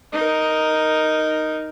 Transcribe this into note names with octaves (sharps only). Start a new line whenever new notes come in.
D#4 A#4